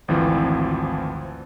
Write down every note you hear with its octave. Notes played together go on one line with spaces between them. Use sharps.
G#1 D2 E3 F3 C4